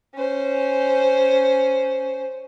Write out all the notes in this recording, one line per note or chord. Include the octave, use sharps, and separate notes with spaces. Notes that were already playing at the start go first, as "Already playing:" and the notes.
C#4 C5